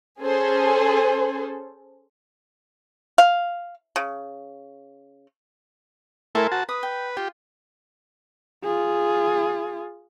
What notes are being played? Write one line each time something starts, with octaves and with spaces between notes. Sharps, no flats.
C#4 G#4 A4 C5
F5
C#3
A3 E4 A4 A#4 C5 G#5
F#4 A5
B4 D#6
G5
F4 G4
F4 G#4